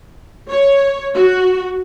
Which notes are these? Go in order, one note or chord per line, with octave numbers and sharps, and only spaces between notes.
C#5
F#4